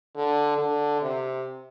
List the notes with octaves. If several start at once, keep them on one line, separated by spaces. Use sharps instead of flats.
D3
D3
C3